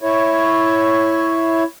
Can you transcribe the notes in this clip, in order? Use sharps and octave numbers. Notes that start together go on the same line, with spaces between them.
E4 C#5